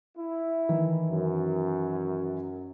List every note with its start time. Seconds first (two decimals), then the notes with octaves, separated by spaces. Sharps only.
0.17 E4
0.69 D#3 E3
1.10 F#2